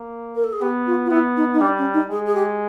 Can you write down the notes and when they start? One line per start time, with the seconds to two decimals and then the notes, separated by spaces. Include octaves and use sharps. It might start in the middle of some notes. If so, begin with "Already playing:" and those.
Already playing: A#3
0.35 A#4
0.43 A4
0.52 G#4
0.61 B3 G4
0.86 F4
1.05 F4
1.10 B3 E4
1.36 D#4
1.53 D#4
1.60 G3 D4
1.78 C#4
1.93 D#4
2.10 G#3 G#4
2.26 G#4
2.34 G4